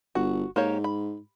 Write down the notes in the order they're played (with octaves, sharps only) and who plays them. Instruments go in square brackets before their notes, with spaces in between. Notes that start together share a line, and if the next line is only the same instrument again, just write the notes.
[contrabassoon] G1 [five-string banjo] F#4
[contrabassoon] G#2 [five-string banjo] A#3 G4 C#5
[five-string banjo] B5